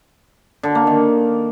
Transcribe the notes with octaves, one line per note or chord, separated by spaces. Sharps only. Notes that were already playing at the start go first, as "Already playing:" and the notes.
D3
A#3
D#3